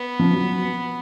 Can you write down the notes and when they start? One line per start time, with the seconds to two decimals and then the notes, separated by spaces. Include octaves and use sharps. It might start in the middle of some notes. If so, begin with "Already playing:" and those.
Already playing: B3
0.19 F3
0.33 F#3